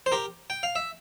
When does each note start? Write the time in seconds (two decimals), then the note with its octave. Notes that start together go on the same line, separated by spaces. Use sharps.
0.06 C5
0.12 G4 A#4
0.50 G5
0.63 F5
0.76 E5